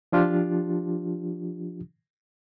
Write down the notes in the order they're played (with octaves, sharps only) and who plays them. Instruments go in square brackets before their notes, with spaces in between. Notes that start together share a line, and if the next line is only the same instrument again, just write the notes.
[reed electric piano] F3 D4 F4 G4